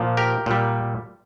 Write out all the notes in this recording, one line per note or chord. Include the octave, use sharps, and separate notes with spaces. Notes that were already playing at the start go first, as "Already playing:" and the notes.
Already playing: A#2 F3
G4 A#4
A#2 G3